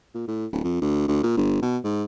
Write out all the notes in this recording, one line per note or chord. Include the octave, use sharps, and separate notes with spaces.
A#2
A2
D1
F2
D2
D2
A#2
G1
B2
G#2